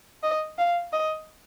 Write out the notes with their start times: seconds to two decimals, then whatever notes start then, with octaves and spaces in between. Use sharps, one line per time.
0.23 D#5
0.58 F5
0.93 D#5